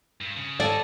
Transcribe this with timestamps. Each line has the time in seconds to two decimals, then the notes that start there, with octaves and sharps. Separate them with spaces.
0.21 G2
0.37 C#3
0.60 F#4 A4 D5 D#5 G#5